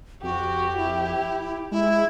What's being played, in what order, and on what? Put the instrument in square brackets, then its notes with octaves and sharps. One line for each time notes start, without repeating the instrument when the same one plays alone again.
[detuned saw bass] F2 [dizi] F#4 [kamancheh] G4
[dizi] E4
[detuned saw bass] G#3 [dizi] E4